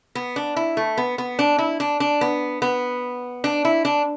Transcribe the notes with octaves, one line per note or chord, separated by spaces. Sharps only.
B3
D4
E4
A3
B3
B3
D4
E4
D4
D4
B3
B3
D4
E4
D4